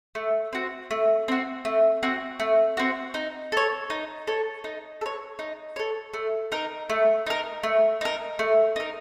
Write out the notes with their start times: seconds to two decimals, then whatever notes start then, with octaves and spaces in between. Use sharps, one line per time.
0.15 A3
0.53 C4 F#4
0.91 A3
1.28 C4 F#4
1.65 A3
2.03 C4 F#4
2.40 A3
2.77 C4 F#4
3.14 D#4
3.52 A4 C#5
3.90 D#4
4.27 A4 C#5
4.64 D#4
5.01 A4
5.06 C#5
5.39 D#4
5.76 A4 C#5
6.14 A3
6.52 D#4 A#4
6.90 A3
7.27 D#4 A#4
7.63 A3
8.01 D#4 A#4
8.39 A3
8.76 D#4 A#4